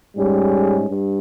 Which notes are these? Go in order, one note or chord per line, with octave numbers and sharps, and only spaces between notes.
G#2 G3 C#4 G#4
G2